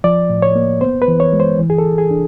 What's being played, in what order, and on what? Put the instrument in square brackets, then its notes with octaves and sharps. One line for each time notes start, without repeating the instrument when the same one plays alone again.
[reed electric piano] F3 D5
A2
C#5
A#3
B3 C5
B4
E3
C#5
G#3
C5
E3
G#4
A4
E3
G#4
D4